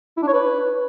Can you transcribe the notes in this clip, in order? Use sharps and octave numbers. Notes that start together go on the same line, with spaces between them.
E4
D4
C#5
B4